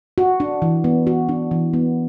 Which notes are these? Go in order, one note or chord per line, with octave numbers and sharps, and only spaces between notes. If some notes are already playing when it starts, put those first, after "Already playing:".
F#4
D4
E3
B3
F#4
D4
E3
B3